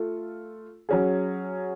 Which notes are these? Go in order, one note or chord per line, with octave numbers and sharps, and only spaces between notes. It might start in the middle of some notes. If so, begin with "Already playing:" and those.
Already playing: A3 F4 A4
F#3 C#4 G#4